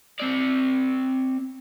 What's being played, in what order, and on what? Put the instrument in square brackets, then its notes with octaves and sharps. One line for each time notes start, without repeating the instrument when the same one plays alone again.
[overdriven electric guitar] C4 D5